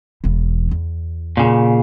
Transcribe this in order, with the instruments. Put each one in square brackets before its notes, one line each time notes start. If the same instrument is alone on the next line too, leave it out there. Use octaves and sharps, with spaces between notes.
[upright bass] E1 E3
E2
[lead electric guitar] A#2 C#3